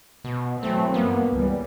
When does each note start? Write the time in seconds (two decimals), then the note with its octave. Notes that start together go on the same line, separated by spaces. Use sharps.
0.24 B2
0.63 E3 F#3 A3 C4
0.94 G2 A#3 B3
1.32 C#2 E3 G3